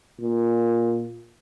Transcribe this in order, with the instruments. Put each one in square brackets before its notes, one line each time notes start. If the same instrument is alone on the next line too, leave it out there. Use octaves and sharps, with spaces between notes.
[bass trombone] A#2